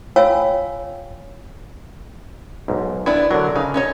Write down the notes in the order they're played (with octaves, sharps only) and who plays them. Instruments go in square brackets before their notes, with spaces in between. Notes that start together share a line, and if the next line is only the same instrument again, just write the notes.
[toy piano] F4 C#5 F5 G5 G#5 E6
[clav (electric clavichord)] B1 G#2
[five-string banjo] B3 D4 E4
[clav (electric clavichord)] D3 F#3 [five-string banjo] A#4
[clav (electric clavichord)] C#3 [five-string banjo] D#4
[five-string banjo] C#4 D#4 C#5